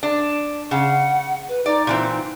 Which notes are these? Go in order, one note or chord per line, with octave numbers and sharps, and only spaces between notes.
D4
C#3 F#5
B4
D#4 D5
A#2 E3 C4